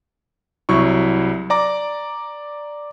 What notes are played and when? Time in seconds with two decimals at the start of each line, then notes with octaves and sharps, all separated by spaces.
0.69 C2 F#3 E4 C#6
1.50 D5 A#5 D6